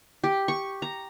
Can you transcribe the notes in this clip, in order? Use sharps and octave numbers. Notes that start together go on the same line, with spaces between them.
G4
C#6
A#5